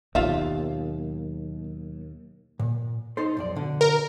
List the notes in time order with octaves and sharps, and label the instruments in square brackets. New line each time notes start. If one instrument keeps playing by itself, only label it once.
[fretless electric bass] D#2 [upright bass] B2 F#3 [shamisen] F4 E5
[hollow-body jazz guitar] A#2
D#4 A4 C5
B1 F2 D5
B2 D3
[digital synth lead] A#4